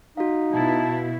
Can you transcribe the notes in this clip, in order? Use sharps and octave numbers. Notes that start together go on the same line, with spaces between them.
D#4 F#4 F5
B2 E4 A5